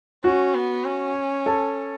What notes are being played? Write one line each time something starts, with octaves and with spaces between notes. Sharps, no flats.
C#4 F#4
B3
C#4
A4